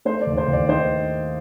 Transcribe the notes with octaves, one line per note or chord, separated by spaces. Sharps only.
A3 C5
D5
D#2
C5
D#2
D5
D#3 C5 D#5